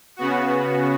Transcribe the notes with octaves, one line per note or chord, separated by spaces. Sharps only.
C#3 B3 F#4